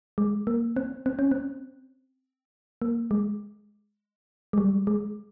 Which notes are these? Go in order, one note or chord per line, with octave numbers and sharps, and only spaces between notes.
G#3
A#3
C4
C4
C#4
C4
A#3
G#3
G#3
G3
G#3